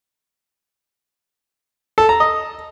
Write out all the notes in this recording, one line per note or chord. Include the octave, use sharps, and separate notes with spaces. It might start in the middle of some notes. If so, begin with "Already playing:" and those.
A4
A#5
D#5